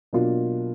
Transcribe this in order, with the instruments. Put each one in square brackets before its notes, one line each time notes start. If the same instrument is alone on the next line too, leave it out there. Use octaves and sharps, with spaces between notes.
[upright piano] B2 F#3 A#3 D4 F4